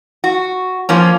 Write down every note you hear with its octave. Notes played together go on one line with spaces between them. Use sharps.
F#4
F3 A#3 C#4